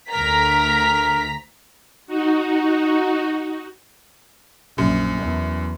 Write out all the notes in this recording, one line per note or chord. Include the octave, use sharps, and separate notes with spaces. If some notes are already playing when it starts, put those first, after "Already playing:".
D2 A#4 A#5 B6
D#4 F#4
A#1 F#2
E2